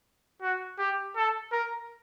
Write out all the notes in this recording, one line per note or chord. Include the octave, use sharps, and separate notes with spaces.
F#4
G4
A4
A#4